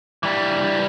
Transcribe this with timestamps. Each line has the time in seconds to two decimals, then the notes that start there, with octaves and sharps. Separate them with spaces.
0.23 E3 G3